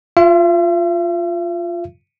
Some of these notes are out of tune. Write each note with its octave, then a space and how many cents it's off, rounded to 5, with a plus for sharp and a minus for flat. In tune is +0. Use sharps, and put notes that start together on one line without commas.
F4 +0 E5 +45